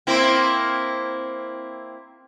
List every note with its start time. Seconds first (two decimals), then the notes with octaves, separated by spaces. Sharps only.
0.07 A#3 C4 E4